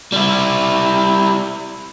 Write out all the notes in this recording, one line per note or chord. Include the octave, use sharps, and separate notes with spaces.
G3 E4